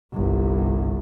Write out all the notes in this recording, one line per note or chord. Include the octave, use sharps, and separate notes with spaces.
G1 C2